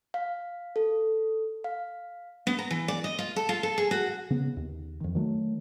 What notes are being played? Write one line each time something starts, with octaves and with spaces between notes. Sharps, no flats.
F5
A4
F5
B3
A#5
E3
D5
D#5
F4
A4
F4
A4
G#4
F#4
C#3 B3
D#2
F2 D#3
D#3 F#3 A3